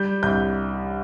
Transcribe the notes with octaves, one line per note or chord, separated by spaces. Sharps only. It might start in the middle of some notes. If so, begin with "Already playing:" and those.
Already playing: G3 G6
C2 G6